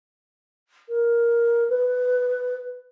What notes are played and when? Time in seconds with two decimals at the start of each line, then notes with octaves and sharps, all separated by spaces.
0.89 A#4
1.69 B4